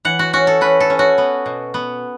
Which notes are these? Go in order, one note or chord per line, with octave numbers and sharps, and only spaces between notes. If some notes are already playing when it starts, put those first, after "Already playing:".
E3 F#5
F#4
C#4 F#4
A4
C#4 B4
A4
C#4
F#4
B3
B2
B3